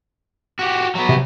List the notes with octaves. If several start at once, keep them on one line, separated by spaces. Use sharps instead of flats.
F#4 G4
F#3 B3
C3